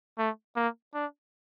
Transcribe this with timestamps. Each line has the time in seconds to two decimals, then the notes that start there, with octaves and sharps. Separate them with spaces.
0.18 A3
0.56 A#3
0.94 D4